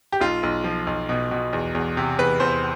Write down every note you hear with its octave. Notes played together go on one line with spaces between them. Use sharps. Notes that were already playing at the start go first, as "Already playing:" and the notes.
G4
B1 F4
B1
F3
B1
B2
B2
E2
E2
C3
E2 B4
E2 C5